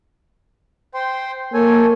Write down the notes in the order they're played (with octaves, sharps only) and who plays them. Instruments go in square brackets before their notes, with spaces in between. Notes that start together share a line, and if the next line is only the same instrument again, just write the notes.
[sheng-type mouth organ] C5 G5 C6
[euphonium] A#3 [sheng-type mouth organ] A4 C#5 G#5